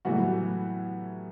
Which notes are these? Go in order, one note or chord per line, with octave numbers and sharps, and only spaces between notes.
A2 E3 F#3 G3 B3 F#4